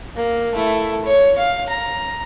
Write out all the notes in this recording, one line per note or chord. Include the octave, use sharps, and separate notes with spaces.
A#3
A3 E4
C#5
F5
A#5